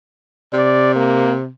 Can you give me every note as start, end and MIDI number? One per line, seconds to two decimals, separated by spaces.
0.53 1.49 48
0.53 0.92 74
0.95 1.34 58